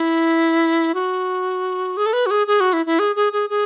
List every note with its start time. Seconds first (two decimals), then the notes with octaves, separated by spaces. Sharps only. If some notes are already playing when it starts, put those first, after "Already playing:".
Already playing: E4
0.94 F#4
1.97 G#4
2.06 A4
2.13 B4
2.26 F#4
2.31 G#4
2.47 G#4
2.60 F#4
2.73 E4
2.86 E4
2.99 G#4
3.16 G#4
3.33 G#4
3.50 G#4